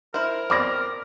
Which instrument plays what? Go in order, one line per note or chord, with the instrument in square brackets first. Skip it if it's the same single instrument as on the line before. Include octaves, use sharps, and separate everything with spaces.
[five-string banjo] E4 C5 [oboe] A#4
[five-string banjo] C4 D5 [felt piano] B5 D6 A#6